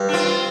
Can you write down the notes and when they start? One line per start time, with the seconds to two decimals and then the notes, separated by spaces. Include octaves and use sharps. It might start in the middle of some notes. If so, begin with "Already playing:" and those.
Already playing: G2
0.09 D4
0.13 C4 F4